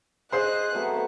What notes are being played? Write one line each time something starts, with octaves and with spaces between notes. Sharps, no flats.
G#4 C5 D#5 G#5 C6 F#6
F#3 A3 B3 C4